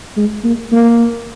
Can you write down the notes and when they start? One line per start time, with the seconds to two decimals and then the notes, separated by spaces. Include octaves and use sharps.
0.17 G#3
0.44 A#3
0.72 A#3